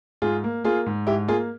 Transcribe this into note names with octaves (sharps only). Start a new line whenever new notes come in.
G#2 F4 G#4
A#3
A#3 F4 G#4
G#2
G#2 E4 G4
A#3 F4 G#4